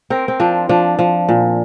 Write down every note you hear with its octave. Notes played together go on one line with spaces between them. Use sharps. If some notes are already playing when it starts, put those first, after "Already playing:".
C4 A#4
C4
F3 D4
F3 D4
F3
A#2